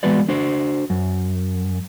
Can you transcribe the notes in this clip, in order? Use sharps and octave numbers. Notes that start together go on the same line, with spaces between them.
E3 G#3 B3 F#4 B4 D5
D4 F#4 C5
F#2